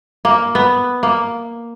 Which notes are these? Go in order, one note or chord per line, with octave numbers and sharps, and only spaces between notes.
A#3
B3
A#3